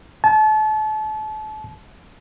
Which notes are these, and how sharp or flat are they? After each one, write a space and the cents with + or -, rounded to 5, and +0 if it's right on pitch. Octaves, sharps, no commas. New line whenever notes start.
A5 -35